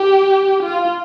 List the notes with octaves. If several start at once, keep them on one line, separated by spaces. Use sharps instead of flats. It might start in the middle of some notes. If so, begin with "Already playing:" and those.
Already playing: G4
F4